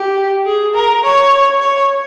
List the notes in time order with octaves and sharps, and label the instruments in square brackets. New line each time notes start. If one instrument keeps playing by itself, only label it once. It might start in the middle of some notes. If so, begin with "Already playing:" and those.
Already playing: [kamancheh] G4
G#4
A#4
C#5
C#5